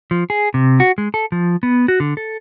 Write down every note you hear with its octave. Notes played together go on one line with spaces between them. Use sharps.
F3
G#4
C3
F#4
G#3
A4
F3
B3
F#4
D3
A4